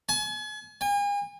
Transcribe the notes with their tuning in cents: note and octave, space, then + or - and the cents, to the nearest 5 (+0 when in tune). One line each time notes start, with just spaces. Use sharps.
G#5 +40
G#5 -40